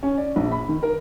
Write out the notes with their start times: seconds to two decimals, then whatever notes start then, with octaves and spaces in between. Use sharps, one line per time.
0.03 C#4
0.18 D5
0.36 A#1
0.51 B5
0.69 D#3
0.83 A#4